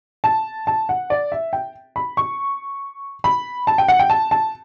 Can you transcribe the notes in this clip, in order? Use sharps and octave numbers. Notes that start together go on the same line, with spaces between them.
A5
A5
F#5
D5
E5
G5
B5
C#6
B5
A5
G5
F#5
G5
A5
A5